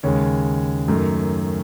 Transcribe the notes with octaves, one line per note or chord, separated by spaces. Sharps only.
D#2 C#3 G#3 C#5
F#2 D#3 A3